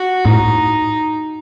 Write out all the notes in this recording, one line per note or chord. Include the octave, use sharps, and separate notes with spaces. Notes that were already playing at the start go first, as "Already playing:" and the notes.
Already playing: F#4
A2 D#4